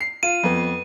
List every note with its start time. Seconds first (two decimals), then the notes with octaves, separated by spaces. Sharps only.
0.01 C7
0.23 F4 D#7
0.43 F2 B3